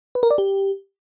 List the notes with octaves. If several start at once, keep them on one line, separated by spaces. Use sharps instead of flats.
B4
A#4
D5
G4